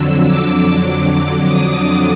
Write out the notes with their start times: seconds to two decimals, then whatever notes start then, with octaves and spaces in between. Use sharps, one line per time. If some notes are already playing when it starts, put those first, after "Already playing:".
Already playing: F2 D3 F#3 E6
0.25 D6
0.67 F2 D3 F#3
1.48 D#6